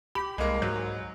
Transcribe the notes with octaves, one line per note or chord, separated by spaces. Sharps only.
G4 B5
C2 G#3 A#3
G#2 F#3